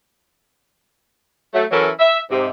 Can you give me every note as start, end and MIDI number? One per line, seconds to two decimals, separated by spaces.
1.54 1.65 54
1.54 1.65 57
1.71 1.90 52
1.71 1.90 54
1.71 1.90 61
1.71 1.90 64
1.71 1.90 69
1.71 1.90 70
1.99 2.18 76
2.30 2.48 44
2.30 2.48 48